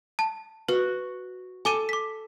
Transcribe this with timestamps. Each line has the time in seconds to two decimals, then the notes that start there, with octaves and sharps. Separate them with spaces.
0.19 A5
0.68 F#4 B4
1.65 A4 G#5 D6 D#7
1.89 D6 B6